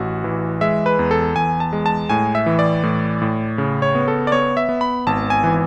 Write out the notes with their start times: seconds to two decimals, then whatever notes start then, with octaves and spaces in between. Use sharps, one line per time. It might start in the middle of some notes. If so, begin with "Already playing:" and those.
Already playing: A1 F#4
0.24 E3
0.61 G#3 E5
0.86 B4
0.99 E2
1.11 A4
1.36 E2 G#5
1.60 A5
1.73 G#3
1.86 A5
2.10 A2 G#5
2.35 E5
2.46 E3
2.59 D5
2.83 A2
3.22 A2
3.58 C#3
3.82 C#5
3.95 B3
4.08 A4
4.27 D5
4.32 B3 C#5
4.57 E5
4.69 B3
4.81 B5
5.07 G#1 A5
5.30 G#5
5.44 E3